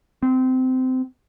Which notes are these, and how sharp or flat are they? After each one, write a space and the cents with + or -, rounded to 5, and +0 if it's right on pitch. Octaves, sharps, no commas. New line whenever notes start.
C4 -20